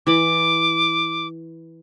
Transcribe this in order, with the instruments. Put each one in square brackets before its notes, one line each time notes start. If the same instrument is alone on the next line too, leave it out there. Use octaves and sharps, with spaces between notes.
[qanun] E3 B5 [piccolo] D6